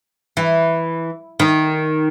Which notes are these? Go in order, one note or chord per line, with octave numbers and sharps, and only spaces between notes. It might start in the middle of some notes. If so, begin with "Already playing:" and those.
E3
D#3